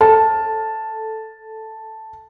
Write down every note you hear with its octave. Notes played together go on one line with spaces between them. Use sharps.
A4 A5